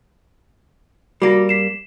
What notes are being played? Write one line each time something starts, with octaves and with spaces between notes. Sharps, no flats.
G3 A#3 F#4 A#6
B6 C7 E7